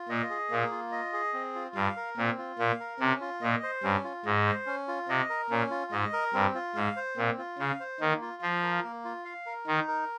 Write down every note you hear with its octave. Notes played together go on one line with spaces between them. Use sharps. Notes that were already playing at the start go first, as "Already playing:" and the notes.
Already playing: F4
A#2 D#5
G#4
A#2 A#3
F4
D#5
G#4
C4
F4
G2 F5
A#4
A#2 C4
F4
A#2 F5
A#4
C3 C#4
F4
A#2 D#5
C5
G2 C#4
F4
G#2 D#5
C5
C#4
F4
C3 D#5
A#4
A#2 C#4
F4
G#2 D#5
A#4
G2 C4
F4
G#2 F5
C5
A#2 C4
F4
C#3 F5
C5
D#3 A#3
F4
F3 F5
A#4
A#3
F4
F5
A#4
D#3 D#4
A#4